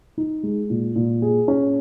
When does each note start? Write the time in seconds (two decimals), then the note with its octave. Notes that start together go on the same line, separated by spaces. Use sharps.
0.18 D#4
0.43 G#3
0.70 A#2
0.96 A#2
1.22 G#4
1.48 C#4